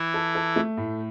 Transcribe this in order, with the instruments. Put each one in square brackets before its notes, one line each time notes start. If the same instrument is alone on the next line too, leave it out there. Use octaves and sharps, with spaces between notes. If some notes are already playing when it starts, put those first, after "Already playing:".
Already playing: [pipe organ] E3 E4
[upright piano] A4
A4
A3
A2